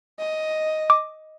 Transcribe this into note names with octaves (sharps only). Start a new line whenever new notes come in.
D#5
D6